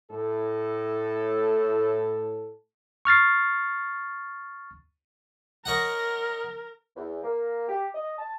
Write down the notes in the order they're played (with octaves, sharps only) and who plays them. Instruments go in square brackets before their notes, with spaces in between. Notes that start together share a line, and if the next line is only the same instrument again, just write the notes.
[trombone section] A2 A4
[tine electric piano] C#6 F6 A6 C7
[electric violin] A#4 [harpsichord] C#5 D#5 F#5
[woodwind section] E2
A#3
G4
D#5
A5